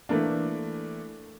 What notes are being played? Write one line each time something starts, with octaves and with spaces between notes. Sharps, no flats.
E3 A3 A#3 D4